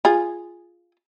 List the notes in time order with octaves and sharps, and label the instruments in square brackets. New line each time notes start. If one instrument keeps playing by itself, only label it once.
[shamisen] F4 G#4